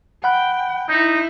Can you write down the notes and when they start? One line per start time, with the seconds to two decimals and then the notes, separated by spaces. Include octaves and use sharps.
0.24 F#5 G5 B5 F#6
0.89 D#4 E4 G6